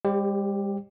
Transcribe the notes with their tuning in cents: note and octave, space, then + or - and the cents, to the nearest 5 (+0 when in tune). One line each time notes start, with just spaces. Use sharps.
G3 +45 G4 +5 C5 +40